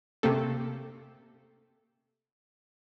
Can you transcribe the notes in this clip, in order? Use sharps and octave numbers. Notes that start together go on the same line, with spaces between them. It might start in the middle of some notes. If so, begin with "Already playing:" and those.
C3 A3 A#3 C4 A4